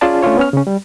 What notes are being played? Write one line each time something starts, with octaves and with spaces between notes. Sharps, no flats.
C#4 F4 G#4 D5 A5
A3 C#4 D4 F4 C#5
B3 C#4 F6
C#3 C#4
G3